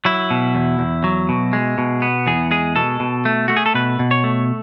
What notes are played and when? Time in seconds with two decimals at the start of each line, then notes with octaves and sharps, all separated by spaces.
0.05 F#3 E4
0.31 B2
0.55 E2
0.79 E2
1.04 F#3
1.29 B2
1.53 G#3
1.78 B2
2.02 B3
2.27 E2 G#4
2.51 G#3 G#4
2.76 B2 A4
3.00 B2
3.25 A3
3.48 A3 F#4
3.57 G#4
3.66 A4
3.75 B2 B4
3.99 B2
4.11 C#5
4.24 A3